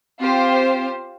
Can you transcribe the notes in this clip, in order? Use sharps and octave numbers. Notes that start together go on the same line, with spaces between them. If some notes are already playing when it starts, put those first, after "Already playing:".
C4 F4 G4 C5